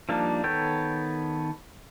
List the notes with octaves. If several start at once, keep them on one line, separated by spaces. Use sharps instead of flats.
F3 G3 A#3 D4 D#4
D#3 B3 A4 C#5 G5